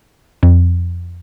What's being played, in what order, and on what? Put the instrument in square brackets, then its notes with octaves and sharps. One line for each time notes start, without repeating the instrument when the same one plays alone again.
[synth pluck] F2